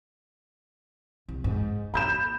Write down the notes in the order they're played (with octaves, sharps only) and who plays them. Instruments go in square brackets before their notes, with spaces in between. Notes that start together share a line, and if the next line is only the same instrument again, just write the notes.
[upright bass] C2
G#2
[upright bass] A#3 [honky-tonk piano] B5 G6 E7